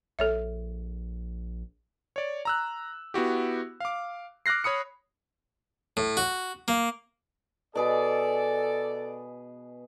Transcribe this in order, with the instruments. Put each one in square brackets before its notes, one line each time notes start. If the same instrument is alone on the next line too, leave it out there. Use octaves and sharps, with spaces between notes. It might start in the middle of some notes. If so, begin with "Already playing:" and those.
[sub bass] A#1 [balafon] A4 C#5 E5
[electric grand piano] C#5 D5
A#5 E6 F#6
B3 E4 F#4 G4
F5 D6
D6 F6 F#6 A#6 C7
C#5 B5 D#6 C#7
[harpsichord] A2
F#4
A#3
[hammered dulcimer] B2 G#4 B4 [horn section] A4 D5